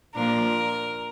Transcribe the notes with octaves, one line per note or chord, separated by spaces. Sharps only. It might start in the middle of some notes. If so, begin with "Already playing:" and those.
A#2 F3 A#3 D4 F4 A#4